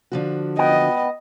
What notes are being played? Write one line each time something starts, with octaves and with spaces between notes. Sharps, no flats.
D3 F3 F#4
B3 D#5 G5